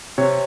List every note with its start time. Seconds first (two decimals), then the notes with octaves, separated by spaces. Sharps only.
0.18 C3 C#5